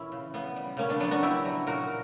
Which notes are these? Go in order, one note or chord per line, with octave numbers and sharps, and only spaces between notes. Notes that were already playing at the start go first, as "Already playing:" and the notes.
Already playing: A#2 E3 C#4 E4 F#4
C#3
C#3 B3
G3
C#3 A#3 C#4
B3 D4
F#3 B3 D4
D4 F#4
C#3 E4 G4
F#3
A#2 F#4 A#4